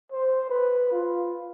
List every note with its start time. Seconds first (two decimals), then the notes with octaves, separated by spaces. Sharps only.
0.12 C5
0.50 B4
0.92 F4